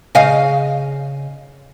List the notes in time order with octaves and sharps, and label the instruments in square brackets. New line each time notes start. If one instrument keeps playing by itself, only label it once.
[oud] C#3 D#5 F5